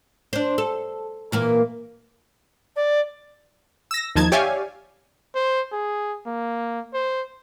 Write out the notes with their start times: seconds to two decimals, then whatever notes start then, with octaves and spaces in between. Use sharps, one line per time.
0.33 D4 C5
0.58 A4
1.32 A#2 E3 A#3
2.76 D5
3.91 E6 A#6
4.16 D#2 F3 D#4 A5 G#6
4.32 G4 C#5 D5 E5 F5 G#5
5.35 C5
5.72 G#4
6.26 A#3
6.94 C5